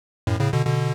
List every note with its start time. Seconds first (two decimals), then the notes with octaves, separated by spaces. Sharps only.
0.27 F#2 A2
0.40 A2 C#3
0.53 B2 D3
0.66 B2 D3